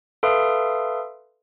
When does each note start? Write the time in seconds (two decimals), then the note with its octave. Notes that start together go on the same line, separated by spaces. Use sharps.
0.23 A4 B4 E5 F5 C6 D#6